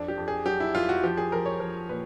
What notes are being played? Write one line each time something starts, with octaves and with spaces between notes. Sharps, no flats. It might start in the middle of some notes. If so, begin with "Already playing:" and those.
Already playing: F2 D4
G4
F2
G#4
F#3 G4
E4
F2 F4
F#4
F3 G4
G#4
F3 A#4
C#5
F3
A#2 B4